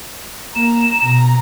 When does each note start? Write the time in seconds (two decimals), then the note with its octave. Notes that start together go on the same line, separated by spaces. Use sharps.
0.55 A#3 A#5 E7
1.02 B2 A#5